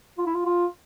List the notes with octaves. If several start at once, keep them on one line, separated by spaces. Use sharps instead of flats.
F4
E4
F4
F4